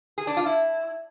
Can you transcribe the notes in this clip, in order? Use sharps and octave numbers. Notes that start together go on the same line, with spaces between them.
G#4
D4
F4
E4